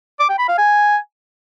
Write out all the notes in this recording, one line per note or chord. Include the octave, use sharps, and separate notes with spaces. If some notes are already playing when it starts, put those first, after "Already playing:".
D6
G5
B5
F5
G#5